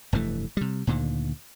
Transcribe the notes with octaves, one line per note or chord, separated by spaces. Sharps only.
F1 G2 E3 A3
C3 G3
D2 A#2 D3 D#3